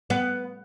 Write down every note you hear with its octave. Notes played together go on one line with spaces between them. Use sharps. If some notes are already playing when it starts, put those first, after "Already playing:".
B3